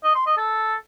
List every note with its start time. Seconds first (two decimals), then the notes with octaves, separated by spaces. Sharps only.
0.04 D#5
0.15 C6
0.26 D#5
0.37 A4